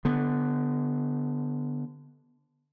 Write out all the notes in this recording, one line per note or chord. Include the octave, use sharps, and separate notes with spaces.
D3 B3